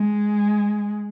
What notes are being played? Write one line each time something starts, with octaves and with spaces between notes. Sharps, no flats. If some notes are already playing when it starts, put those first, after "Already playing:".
Already playing: G#3